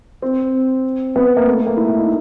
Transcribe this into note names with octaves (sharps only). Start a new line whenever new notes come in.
C4
B3
A#3
A3
A3
A#3
E4
E4
D#4